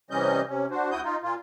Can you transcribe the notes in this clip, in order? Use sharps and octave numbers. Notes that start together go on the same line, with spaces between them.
C3 E3 G3 C#4 D#5 G6
C3 C#4
D4 F#4 C5
D2 E4 F#4 D#6 G6
D#4 F4
A#2 A#3 F4